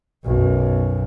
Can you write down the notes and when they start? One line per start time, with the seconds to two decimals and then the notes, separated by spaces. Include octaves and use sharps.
0.25 B1 F#2